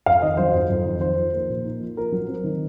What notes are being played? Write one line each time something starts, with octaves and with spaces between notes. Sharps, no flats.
F2 F5
D#3 D#5
F#3 C5
F2
F2
D#3
D#4 C5
F3
A#3
A#2
D#4
F3
F4 A#4
F#3
C4
D#3